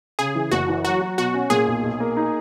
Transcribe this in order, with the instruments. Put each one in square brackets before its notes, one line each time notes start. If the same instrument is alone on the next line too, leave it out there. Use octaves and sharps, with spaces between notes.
[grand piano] C#3 [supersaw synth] G#4
[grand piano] E3
[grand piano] F#1 [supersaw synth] F#4
[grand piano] E3
[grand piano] F#3 [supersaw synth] F#4
[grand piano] F#3
[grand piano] B2 [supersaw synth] F#4
[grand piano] C#4
[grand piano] A#2 [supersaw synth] G#4
[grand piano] B1
B1
A#3
D#4